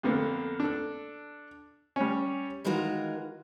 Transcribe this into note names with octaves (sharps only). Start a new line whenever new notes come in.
F2 D3 A#3 B3
D4 A4
G3 C#4
D#3 E3 G#3 F4 F#4 A#4